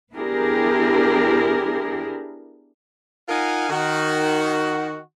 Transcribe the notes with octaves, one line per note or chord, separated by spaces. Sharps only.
B3 D4 E4 G4 G#4 A#4
D#4 F4 A#4 F5 F#5 G#5
D#3 F#4